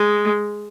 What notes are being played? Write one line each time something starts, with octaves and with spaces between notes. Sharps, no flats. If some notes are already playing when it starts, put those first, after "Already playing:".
Already playing: G#3